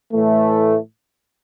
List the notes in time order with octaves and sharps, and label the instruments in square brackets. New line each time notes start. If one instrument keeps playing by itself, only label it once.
[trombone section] A2 E3 A3